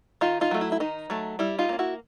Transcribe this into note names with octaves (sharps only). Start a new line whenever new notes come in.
D#3 D#4 F4
D#4 F4
F#3 A3
E4
E4
D#3 D#4
F#3 A3
G3 E4
D#4 F4
A#3 C#4
E4 F#4